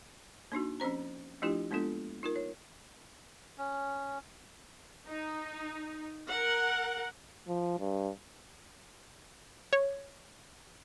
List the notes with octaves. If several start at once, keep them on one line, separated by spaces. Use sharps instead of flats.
A#3 D4 D#4 F#4
F3 C4 C#4 C5 A#5
F3 A3 D4 E4 F4 G4
G#3 A#3 B3 D4 F4 A4
D#4 F4 A#4
C#5
C#4
D#4
A#4 F#5
F3
G2
C#5